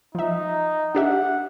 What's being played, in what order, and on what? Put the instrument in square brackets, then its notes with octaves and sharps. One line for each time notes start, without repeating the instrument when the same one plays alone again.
[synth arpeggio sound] F3 E5 [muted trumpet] D#4
[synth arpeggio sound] D4 G4 E5 [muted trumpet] F#5